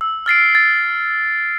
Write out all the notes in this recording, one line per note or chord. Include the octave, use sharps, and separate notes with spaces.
E6
F6 A6 C7 D7
A6